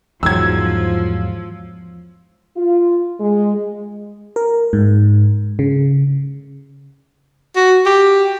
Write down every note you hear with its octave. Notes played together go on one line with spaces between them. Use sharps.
E2 G#2 F3 F#3 E6 G#6
F4
G#3
A#4
G#2
C#3
F#4
G4